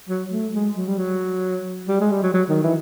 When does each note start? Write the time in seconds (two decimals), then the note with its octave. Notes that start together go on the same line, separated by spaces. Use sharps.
0.09 F#3
0.32 A3
0.54 G#3
0.76 F#3
0.88 G3
0.98 F#3
1.89 G3
2.01 G#3
2.11 G3
2.23 F#3
2.34 F#3
2.49 D#3
2.63 E3